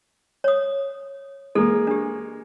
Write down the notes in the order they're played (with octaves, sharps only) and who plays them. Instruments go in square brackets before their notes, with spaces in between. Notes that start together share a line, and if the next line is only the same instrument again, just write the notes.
[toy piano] C#5 D#6
[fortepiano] G#3 A#3 [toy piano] A4
[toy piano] D4 G4